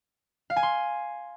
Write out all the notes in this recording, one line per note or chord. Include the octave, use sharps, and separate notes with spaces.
F5
G#5
C6